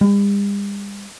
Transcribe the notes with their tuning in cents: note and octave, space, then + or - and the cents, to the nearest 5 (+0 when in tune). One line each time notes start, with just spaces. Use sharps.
G3 +45